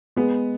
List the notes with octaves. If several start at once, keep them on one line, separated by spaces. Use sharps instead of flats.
G#3 B3